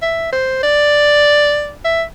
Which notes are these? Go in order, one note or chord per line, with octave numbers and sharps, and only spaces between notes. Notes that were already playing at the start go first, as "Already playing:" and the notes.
E5
C5
D5
E5